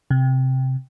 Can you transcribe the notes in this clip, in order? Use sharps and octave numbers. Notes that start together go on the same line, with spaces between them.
C3